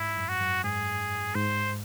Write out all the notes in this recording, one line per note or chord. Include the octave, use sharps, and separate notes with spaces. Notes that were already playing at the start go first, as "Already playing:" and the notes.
Already playing: G#2 E4
F#2
F#4
F#2
G#2 G#4
G#2 C5